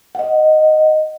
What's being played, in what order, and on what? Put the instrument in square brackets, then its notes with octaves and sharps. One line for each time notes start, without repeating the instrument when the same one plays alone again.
[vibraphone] D#5 F#5